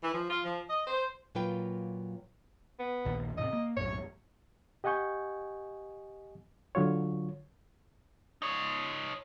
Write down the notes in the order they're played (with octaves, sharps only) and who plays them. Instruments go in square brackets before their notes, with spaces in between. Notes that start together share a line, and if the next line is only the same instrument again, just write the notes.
[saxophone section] E3
F3
F4
F3
D#5
C5
[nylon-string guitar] A#2 F#3 A#3 F4 B4 G5
[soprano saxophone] B3
[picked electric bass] A#1 D#2 A#2
[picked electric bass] D2 A2 C3 [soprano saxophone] D#5
[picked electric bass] A#3
[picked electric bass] B1 F#2 A2 [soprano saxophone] C#5
[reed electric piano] G4 D#5 F#5 G#5 C#6 G6
D3 F#3 F4 C#5
[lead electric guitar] D#4 C#5